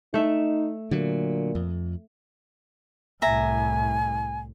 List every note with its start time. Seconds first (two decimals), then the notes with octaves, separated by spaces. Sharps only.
0.14 A3 D#4 E5
0.91 A#2 D3 F#3
1.55 F2
3.22 C2 A2 E5 G#5 A#5